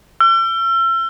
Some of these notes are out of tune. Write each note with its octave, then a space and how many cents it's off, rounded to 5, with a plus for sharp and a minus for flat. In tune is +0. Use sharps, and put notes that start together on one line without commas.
E6 +40